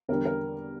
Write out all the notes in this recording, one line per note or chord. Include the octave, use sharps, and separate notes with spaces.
E2 D3 G3 A#4
A#4